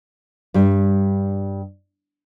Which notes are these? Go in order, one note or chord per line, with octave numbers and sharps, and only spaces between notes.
G2 G3